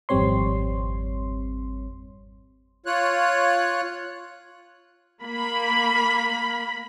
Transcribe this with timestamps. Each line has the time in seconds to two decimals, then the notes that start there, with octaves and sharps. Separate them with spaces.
0.09 G#1 F2 G3 C4 C#5 C6
2.86 F4 C#5 F#6
5.21 A#3 B5